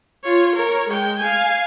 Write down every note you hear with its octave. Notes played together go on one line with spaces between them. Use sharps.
F4 C#5
A#4 C#5
G#3 G5
F5 G#5